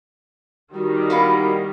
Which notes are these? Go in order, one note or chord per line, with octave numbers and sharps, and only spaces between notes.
D#3 G3 F#4
A#3 B3 E4